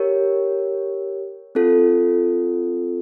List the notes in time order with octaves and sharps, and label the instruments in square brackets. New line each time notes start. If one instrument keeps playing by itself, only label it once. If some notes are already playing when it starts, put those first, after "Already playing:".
Already playing: [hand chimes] G4 A#4 C#5
C4 F4 A4